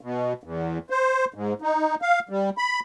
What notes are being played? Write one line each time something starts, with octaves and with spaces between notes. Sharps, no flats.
B2
E2
C5
G#2
D#4
F5
G3
B5